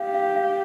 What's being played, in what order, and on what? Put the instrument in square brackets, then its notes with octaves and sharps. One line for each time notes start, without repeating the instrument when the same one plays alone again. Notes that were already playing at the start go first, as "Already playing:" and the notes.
Already playing: [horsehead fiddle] G4 [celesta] F5
[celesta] F5
F5